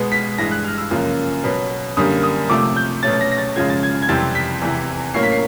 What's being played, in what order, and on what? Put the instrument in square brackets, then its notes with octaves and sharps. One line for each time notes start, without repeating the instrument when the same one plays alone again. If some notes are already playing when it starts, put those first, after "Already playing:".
Already playing: [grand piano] B2 G#3 B3
B6
G2 E3 G#3 A#6
F#6
F6
E6
F#2 C#3 F3 A#3
B2 F#3 B3
F#2 D3 G3 A#3 D#6
D#6
C3 F3 A3 D6
G6
B2 F#3 A3 C#4 A6
A6
A#6
A#6
A6
F#2 C#3 F3 G#3 G#6
A6
G#6
G#6
F2 C3 E3 G3 C4 A6
B6
E2 C3 E3
A2 F#3 A#3 C#4 C7
B6
C7